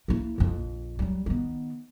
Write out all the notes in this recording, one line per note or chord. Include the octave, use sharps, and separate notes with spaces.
A#3 E4
A#1 F2
F#3 G3
D#3 B3